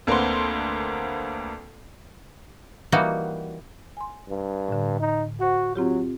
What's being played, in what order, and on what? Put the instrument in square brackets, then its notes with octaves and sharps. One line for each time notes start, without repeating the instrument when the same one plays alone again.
[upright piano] D2 A#3 C4 B4 F#5 C6
[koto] E3 G3 A#3 D#4 F#4
[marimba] G#5 C6
[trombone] G2
[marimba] A2 D3
[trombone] D#4
[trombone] F#4 [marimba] C5 F#5
[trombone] F#3 [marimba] C4 F4 G4